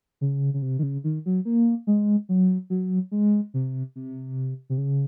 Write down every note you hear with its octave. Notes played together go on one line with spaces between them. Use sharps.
C#3
C#3
C3
D#3
C#3
D#3
F#3
A#3
G#3
F#3
F#3
G#3
C3
C3
C3
C#3